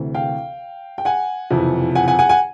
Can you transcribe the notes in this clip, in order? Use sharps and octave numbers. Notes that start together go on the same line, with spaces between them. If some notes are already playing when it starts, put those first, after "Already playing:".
Already playing: D2 C3 E3
F5 G5
G5
F#5 G#5
F#1 F2 C3 E3
F#5 G#5
F#5 G#5
F#5 G#5
F#5 G#5